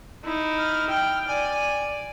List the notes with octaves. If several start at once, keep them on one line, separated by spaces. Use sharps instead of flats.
D#4 E4
F6
G5 F6
D5 G#5